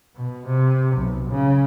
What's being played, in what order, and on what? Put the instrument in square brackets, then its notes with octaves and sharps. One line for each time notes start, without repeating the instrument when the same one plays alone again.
[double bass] B2
C3
B1
C#3